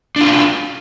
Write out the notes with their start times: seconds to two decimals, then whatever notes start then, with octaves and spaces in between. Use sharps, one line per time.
0.16 D4
0.21 F4
0.25 C#4